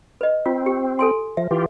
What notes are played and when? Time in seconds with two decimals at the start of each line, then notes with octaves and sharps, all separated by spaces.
0.21 B4 D#5
0.46 C4 F4
0.66 G4
0.99 A4 G#5 C6
1.37 F3 E5
1.51 E3 F4 G4